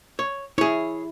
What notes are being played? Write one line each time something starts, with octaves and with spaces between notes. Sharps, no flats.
C#5
E4 G#4 C#5